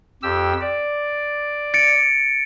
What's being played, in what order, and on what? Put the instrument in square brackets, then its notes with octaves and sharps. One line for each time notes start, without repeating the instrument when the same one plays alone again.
[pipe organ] F2 G4 E6
D5
[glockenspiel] A6 C#7 D7